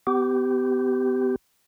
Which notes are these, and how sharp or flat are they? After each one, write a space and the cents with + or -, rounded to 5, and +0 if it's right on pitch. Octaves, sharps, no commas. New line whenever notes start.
B3 +30 G4 -15